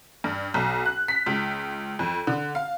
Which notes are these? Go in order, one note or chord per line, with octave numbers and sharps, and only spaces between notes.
G2
B1
F#6
B6
C#2
F2
D3
F5